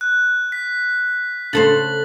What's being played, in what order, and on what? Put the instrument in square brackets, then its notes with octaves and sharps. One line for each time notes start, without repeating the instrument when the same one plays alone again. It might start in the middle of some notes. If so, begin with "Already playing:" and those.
[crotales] F#6
B6
[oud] C#3 A4 C5 [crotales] A6 F#7